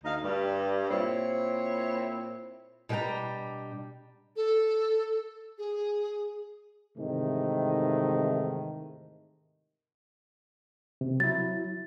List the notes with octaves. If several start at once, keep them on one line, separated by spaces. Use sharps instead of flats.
D2 D#4 F5
G2 G3
A#2 C4 E4 C#5
B2 G3 D4 G#4 G5 A#5
A4
G#4
G#2 C3 D#3 E3 A3
C3
F#3 E4 A6